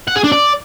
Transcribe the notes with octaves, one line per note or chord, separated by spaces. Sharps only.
F#5
G#4
D4
D5